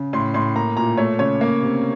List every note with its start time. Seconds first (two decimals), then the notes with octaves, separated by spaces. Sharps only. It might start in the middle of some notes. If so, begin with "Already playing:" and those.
Already playing: C#3
0.13 A2 C6
0.34 A2 C6
0.55 A#3 A#5
0.77 A#2 A#5
0.97 A3 C#5
1.19 C#3 C#5
1.41 A#3
1.62 C3